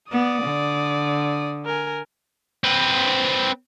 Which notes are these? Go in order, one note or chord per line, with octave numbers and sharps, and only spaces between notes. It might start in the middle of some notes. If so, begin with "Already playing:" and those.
B3 D5 D#6
D3
A#4 G#5
C4 B4